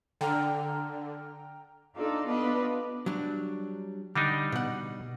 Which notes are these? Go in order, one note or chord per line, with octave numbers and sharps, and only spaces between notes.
D3 G5 A#5 F6
D4 D#4 F4 A4 D5
B3 D4 F4 B4 D5 D#5
F#3 G3 D4
D3 G3 D4 D#4
B2 F#5